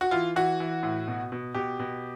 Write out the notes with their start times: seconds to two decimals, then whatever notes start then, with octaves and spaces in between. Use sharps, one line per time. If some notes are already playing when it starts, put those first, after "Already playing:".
0.01 F#4
0.11 E3 F4
0.36 E3 F#4
0.60 E3
0.83 A2
1.08 B2
1.32 B2
1.54 B2 G4
1.79 B2